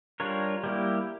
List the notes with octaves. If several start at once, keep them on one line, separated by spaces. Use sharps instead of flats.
G3 D4 F4 A#4 C#5
G3 A#3 E4 G4